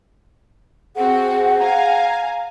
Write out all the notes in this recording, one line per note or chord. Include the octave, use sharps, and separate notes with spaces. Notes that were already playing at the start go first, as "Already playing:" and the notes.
C4 F#4 G#4 F#5
F5 G#5 A#5